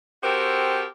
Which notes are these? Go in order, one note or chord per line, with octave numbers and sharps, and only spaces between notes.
C4 F#4 G4 A4 A#4 C5